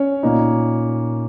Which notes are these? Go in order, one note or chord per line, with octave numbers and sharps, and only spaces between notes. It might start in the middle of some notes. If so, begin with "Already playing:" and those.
Already playing: C#4 C#5
A#2 A#3 D#4